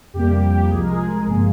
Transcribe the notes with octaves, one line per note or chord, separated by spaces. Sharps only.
F2 C3 G3 A#3 G4
C2 C3 F3 G#3 G#4
A#4
G#3 G#4
G1 G2 F3 A#3